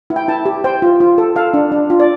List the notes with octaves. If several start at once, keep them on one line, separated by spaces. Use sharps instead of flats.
E4
G5
E4 A5
G4
C5 G5
F4
F4
A4
A4 F5
D4
D4
F4
D5